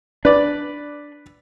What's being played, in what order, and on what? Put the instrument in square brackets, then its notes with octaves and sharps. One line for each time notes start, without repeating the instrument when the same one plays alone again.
[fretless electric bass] D4 [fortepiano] B4 D5